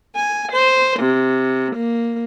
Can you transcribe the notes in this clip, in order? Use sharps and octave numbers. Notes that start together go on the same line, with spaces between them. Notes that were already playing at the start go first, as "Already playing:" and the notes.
G#5
C5
C3
A#3